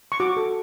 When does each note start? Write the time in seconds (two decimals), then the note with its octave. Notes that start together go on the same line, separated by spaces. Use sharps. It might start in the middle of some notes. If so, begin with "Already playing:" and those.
0.12 C#6
0.20 F#4 D6
0.37 A4